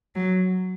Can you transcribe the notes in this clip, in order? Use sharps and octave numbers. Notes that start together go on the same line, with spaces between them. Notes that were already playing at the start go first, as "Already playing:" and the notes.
F#3